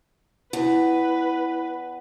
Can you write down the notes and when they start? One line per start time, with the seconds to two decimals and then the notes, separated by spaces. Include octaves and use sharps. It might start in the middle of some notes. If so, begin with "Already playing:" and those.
0.53 E2 E4 B4